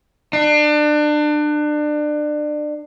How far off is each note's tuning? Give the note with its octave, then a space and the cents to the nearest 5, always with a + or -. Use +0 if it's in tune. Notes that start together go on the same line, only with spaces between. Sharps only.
D4 +30